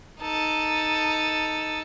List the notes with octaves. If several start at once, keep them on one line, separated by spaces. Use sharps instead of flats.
D#4 A4